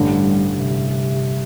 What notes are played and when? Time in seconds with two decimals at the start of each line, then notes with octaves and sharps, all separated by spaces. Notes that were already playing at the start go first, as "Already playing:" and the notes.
Already playing: A1 G2 D3 G3
0.53 C3